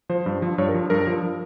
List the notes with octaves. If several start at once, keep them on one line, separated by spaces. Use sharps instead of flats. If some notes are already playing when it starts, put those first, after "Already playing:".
F3 C5
G2
F3
G2 C#5
A#4
F3
G2 A#4
F3